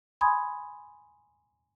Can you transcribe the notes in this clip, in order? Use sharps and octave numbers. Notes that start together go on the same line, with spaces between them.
G#5 B5 C6 D#6 G#6